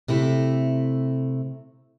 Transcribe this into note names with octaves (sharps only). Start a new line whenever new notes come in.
C3 A3 E4